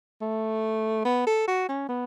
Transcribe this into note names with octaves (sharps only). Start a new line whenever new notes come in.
A3
B3
A4
F#4
C#4
B3